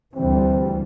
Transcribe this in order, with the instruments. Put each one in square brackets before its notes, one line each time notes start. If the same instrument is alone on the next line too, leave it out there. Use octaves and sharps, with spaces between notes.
[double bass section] D2 E3 G3 [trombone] C4